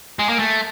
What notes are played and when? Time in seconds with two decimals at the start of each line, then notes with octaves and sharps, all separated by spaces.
0.19 G#3
0.29 A#3
0.39 A3